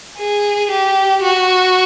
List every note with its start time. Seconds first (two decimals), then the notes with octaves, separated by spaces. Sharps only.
0.19 G#4
0.71 G4
1.23 F#4